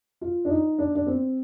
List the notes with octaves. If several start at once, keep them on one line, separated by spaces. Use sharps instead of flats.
F4
D4
D#4
D4
D4
C4